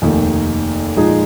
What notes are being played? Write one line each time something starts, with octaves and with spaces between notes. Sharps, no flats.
F1 D#2 D#3
A#2 F3 G#3 D#4 G#4